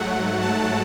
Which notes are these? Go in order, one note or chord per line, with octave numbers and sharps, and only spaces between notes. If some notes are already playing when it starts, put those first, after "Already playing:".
Already playing: G#2 F#3 A3 F#5
A5